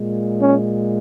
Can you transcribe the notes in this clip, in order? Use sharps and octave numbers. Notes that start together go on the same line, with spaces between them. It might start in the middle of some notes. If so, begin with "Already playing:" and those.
Already playing: A#2 G#3
C#4